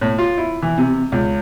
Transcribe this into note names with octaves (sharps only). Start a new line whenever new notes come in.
A2
F4
E4
E3
C3
C#2